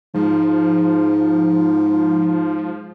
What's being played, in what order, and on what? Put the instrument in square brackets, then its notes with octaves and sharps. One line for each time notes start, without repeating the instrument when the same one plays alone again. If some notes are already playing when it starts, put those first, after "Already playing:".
[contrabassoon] G#2 [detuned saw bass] F3